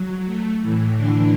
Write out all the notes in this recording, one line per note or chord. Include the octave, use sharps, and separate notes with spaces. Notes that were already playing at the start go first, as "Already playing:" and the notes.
Already playing: F#3
A3
A2 E3
D3 D4